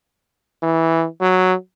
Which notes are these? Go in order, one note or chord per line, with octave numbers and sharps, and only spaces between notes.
E3
F#3